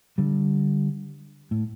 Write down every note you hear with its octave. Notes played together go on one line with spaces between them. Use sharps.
D3 G3
A2